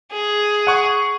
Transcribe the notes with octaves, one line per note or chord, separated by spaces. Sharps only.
G#4
F#5 C#6